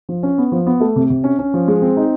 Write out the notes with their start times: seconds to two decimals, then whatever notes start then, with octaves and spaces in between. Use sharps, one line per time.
0.09 F3
0.23 C#4
0.38 B3
0.52 F3
0.66 B3
0.80 A3
0.96 C3
1.10 C3
1.24 C#4
1.39 C#4
1.54 F3
1.68 G#3
1.82 C4
1.97 D#4